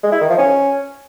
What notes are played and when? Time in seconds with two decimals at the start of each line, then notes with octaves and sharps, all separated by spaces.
0.03 G#3
0.12 E4
0.21 D#3
0.29 F3
0.38 C#4